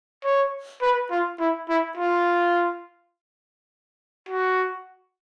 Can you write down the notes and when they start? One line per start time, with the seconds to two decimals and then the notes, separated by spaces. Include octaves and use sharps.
0.24 C#5
0.82 B4
1.11 F4
1.40 E4
1.69 E4
1.97 F4
4.29 F#4